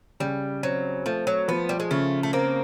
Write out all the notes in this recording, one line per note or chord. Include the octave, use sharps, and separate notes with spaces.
C#3 G3
F#3 C4
F3 A3
F#3
F3 B3
G3
G#3
C#3 A3
A3
A#3 C4